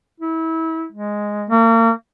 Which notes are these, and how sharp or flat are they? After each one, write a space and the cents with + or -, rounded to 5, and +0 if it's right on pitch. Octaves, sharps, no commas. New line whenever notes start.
E4 -30
G#3 +0
A#3 -40